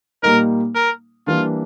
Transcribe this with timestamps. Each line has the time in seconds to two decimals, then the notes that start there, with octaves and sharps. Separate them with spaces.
0.23 A#2 G3 A#3 D#4 A#4
0.75 A#4
1.27 E3 G3 A#3 D4 F4